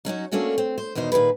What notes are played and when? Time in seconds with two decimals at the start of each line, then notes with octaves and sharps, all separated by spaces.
0.05 F#3 C#4 D#4 F#4
0.32 A3 A#3 C#4 D4 F#4 A4
0.58 C4
0.78 C5
0.95 E2 B2 D#3 D#4 C5
1.12 A#2 D#3 F3 G#4 B4